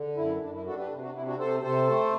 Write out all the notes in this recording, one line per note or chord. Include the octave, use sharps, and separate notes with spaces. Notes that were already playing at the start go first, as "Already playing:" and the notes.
Already playing: D3
F#2 E4
F#2 D4
E4
D4 F#4 A4
G4 B4
C3
D4 F#4
C3 E4
D4 F#4
C3 A4 C5
C3 A4 C5
A3